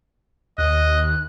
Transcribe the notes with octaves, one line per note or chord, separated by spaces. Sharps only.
D#2 D#5 F#6